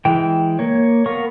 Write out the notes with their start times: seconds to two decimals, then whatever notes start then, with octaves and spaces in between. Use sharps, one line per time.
0.05 E3 G#3 G5
0.59 A#3 C#5
1.06 B3 A#4 F5 C#6